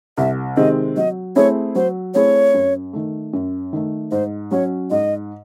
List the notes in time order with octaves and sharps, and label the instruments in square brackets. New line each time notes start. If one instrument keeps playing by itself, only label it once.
[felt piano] C2 [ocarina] E5
[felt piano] C3 D#3 G#3 C4 [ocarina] D#5
[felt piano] F#3 [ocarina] D#5
[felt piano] A3 C4 E4 G#4 [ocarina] C#5
[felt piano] F#3 [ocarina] C5
[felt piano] A3 C4 E4 G#4 [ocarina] C#5
[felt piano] F#2
D#3 A3
F#2
D#3 A3
[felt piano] G#2 [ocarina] C5
[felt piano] F#3 C#4 [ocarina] C#5
[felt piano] G#2 [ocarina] D#5